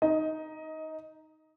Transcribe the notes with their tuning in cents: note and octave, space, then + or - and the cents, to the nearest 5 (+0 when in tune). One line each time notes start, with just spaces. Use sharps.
D#4 +0 D#5 +20